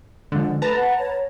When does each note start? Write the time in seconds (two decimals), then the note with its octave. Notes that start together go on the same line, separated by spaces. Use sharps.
0.32 D3 F3 G#3
0.62 A3 B4 A5 A#5
0.76 F#5
0.99 C#5